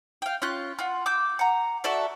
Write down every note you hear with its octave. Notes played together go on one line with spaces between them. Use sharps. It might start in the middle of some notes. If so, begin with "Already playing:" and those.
F5 G5
C#4 F4 F#6
F4 F#5
D6 E6 G6
F#5 A#5
F#4 A4 D5 E5